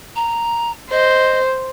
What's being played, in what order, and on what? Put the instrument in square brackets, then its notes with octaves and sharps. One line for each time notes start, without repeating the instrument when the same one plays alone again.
[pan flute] A#5
[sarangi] C5 [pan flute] D#5